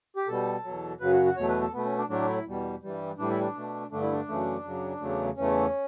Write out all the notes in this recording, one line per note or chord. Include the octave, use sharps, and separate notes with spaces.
G4
B2 G3 A4
E2 B2 F#3
F#2 C#3 F#3 B4
F#4
F#4
E2 B2 F#3 A3 C#5
B4
A4
B2 A3 B3
C#4
D4
A2 F#3 A3 D4
E4
E2 B2 G3
G2 E3 G3
A2 E3 G3 D4
E4
D4
B2 A3
G2 D3 A3 D4
E4
D4
F#2 C#3 E3 A3
F#2 C#3 F#3
E2 C#3 F#3 A3
E2 C#3 E3 A3 C#4